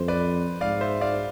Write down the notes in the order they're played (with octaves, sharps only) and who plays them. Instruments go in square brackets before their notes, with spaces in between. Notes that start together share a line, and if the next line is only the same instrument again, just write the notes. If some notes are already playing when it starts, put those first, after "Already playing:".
Already playing: [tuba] F2 [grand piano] C5
[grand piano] B4 D5
[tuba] G#2 [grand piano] D5 F5
[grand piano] C5 E5
D5 F5